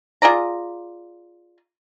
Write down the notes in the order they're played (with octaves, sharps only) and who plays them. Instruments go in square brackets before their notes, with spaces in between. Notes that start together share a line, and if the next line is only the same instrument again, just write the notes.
[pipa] F4 G#4 D5 A#5